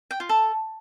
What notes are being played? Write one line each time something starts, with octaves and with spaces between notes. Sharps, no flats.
G5
F4
A4